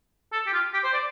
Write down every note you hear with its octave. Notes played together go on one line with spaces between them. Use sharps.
A4
G4
F4
G4
C5
D5